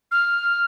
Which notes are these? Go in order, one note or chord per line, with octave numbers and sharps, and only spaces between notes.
F6